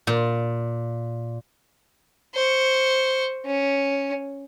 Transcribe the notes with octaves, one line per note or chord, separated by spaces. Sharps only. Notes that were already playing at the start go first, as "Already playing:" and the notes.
A#2
C5 C#6
C#4